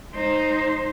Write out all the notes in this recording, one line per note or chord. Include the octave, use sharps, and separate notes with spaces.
D#4 C5